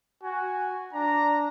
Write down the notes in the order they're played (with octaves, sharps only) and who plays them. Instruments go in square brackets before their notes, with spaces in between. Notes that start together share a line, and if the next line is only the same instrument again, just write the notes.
[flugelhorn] F#4 [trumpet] G#5
[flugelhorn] D4 [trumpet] A#5